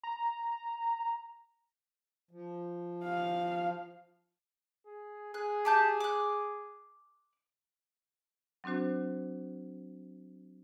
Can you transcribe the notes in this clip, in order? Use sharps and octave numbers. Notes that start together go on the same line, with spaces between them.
A#5
F3
F5
G#4
G#4 F#6
G4 A5 G6
D6 F#6
F#3 C4 D4 F#4 C5